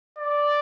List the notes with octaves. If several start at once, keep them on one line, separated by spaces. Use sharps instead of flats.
D5